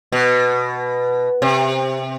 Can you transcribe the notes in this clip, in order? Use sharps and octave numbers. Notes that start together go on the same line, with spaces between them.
B2
C3